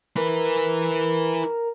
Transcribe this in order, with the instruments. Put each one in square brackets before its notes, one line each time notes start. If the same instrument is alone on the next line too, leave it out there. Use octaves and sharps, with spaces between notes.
[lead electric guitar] E4 B4 [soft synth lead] A#4